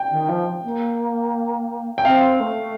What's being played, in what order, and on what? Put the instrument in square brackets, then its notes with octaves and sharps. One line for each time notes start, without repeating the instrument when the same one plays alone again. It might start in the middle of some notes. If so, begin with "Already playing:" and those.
Already playing: [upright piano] G5
[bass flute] D#3
F3
A#3
[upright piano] G5
[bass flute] C4 [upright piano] F5
[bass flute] A3